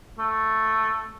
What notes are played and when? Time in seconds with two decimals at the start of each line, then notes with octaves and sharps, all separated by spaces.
0.19 A3